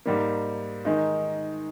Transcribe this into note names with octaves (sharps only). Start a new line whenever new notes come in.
G#2 G3 A#3
D#3 G#3 D#4